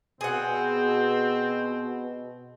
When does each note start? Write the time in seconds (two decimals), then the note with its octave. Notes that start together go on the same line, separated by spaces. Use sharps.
0.21 B2 C4 G#4 F#5